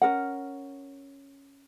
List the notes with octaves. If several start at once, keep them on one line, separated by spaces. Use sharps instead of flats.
C#4 F#4 A#4 F#5